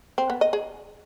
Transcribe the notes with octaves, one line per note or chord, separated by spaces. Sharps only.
C4
B3
D#5
G#4